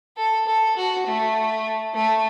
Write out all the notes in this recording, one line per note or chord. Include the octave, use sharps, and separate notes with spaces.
A4
A4
F#4
A3
A3